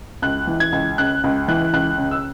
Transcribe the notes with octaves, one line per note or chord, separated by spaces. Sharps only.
C#2 F#6
E3
G#6
C#2
C#3 F#6
C#2
E3 F#6
C#2 F#6
C#3
E6